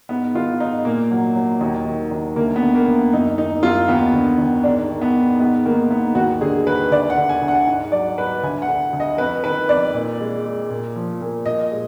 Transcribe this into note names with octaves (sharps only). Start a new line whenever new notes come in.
G#2 B3
D#3 F4
G#2 D#4
A#2 A#3
F#3
F#3
D#2
D#3
D#2
D2 A#3
B3
D3
A#3
D2
F#2 D#4
D#3 D#4
F#2 F4
D#2 B3
D3
D#2
G#2 D4
D#3
B3
G#2
G#2 B3
D#3 A#3
G#2 B3
D#2 F#4
D3 G#4
D#2 B4
D2 D5
F#5
D3
G#5
D2
F#5
G#2
F#3 D5
F#3 B4
D2 G#5
F#5
D3
D2
D#5
F2 B4
D#3 B4
F2 D5
A#2
G#3
G#3
A#2
F3
A#2
A#2 D#5
G#3